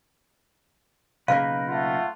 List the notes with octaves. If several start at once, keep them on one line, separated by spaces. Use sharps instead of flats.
B1 C#3 A#3 D#4 A#4 B4 F5
A3 F4 F#5